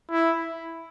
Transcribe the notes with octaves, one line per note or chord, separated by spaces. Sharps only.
E4